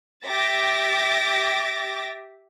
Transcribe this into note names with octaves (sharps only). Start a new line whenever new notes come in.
G4 E5 D6 A6 A#6